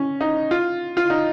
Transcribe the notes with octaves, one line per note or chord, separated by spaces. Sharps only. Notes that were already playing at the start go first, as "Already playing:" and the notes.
Already playing: C#4
D#4
F4
F4
D#4